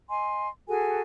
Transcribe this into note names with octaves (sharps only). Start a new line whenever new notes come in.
D#5 G#5 C6
F#4 G#4 A4 G#5